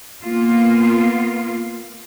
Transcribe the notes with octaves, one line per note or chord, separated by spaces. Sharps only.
A#3 B3 F4